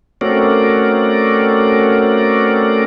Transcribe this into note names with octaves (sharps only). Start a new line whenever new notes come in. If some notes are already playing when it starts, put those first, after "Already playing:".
A3 C4 C#4 F#4 A#4 D5